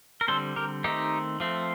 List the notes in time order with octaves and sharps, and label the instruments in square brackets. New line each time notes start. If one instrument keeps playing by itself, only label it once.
[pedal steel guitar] A#4
D3 G3 C4 A4 C5
G4 A#4
D#3 A3 C4 D#4 G4
F3 A3 C4